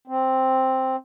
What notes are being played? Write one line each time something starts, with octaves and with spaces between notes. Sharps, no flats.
C4